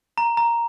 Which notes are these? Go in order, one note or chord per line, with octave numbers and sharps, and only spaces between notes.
A#5
A#5